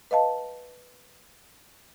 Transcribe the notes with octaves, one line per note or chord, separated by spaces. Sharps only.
B4 D#5 F5 A5